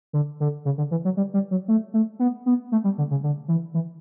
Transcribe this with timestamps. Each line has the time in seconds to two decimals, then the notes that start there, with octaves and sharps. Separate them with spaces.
0.13 D3
0.40 D3
0.65 C#3
0.78 D3
0.91 E3
1.05 F#3
1.17 G3
1.34 G3
1.51 F#3
1.68 A3
1.94 A3
2.19 B3
2.46 B3
2.72 A3
2.84 G3
2.98 D3
3.11 C#3
3.23 D3
3.48 E3
3.74 E3